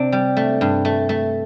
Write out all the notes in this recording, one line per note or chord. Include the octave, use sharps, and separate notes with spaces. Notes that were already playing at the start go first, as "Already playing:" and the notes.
Already playing: C3 D4
G3
A3
G2
A3
A3